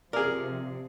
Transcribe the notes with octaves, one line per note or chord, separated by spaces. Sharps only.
C3 F3 G#4 A#4 D5